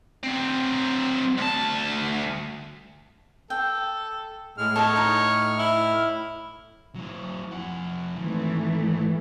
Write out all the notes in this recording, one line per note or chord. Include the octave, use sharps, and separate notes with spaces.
F#3 C4
D2 A5
A4 G5
A2 G#3 F6
A4 C#5 D#5 A5
D#4 D#5
E4
F#3 E4
F2 F#5
G#2 D#3 E3 A3